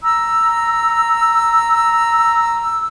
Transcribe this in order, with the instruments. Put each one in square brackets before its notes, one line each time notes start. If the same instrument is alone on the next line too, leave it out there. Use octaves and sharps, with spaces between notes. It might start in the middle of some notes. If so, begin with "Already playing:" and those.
[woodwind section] A#5 E6